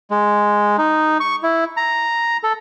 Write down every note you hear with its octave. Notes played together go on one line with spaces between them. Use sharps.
G#3
D#4
C#6
E4
A#5
A4